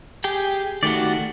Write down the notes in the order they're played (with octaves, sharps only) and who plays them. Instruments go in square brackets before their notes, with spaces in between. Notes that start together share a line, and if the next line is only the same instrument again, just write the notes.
[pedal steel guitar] G4 G#4 G5
[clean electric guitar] D#3 A3 G4 [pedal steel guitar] F#4 D5